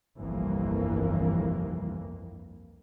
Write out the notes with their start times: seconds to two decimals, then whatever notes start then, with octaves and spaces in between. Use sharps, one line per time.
0.19 G1 C2 F2 E3 A#3